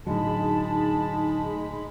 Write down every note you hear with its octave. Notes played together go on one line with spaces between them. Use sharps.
A2 D3 F#3 G#3 D#4 G#4 A5 B5